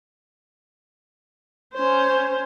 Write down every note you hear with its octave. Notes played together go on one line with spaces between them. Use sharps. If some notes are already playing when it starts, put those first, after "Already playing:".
C#4 C5